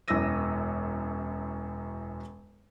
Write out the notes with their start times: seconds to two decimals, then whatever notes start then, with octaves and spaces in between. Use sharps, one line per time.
0.08 E1 F#2 E4 E6 A#6 D#7